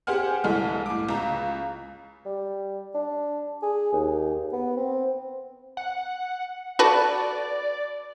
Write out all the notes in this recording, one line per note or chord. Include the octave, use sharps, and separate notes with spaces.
G4 G#4 C5 F#5 G#5 F6
C2 G2 E3 G#3 A3 F6
A2 D6
C#2 A#5
G3
D4
G#4
D#2
B3
C4
F#5
F#4 A4 B4 D5